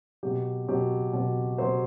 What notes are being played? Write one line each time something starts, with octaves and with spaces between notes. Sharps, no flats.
B2 F#3 G4
B2 F#3 G4
B2 F#3
B2 F#3 C5